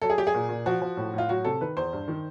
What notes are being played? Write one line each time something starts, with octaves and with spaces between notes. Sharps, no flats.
F#3 A4
G#4
F#3 G4
G#4
A#2
A#2
F3 F#4
F3
A2
A2 F4
F#3 F#4
C3 A4
D#3 B4
E2 C5
G2
D#3